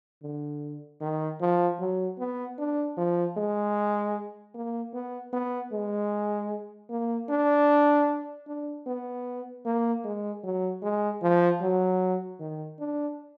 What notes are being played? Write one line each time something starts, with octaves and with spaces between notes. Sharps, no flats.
D3
D#3
F3
F#3
B3
D4
F3
G#3
A#3
B3
B3
G#3
A#3
D4
D4
B3
A#3
G#3
F#3
G#3
F3
F#3
D#3
D4